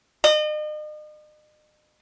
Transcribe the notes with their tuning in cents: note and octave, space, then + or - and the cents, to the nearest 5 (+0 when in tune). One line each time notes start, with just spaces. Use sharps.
D#5 -40